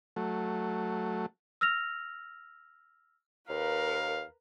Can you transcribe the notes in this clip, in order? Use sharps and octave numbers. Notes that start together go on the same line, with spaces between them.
F#3 A3
E6 F6 A#6 F7
D#2 A#4 B4 F5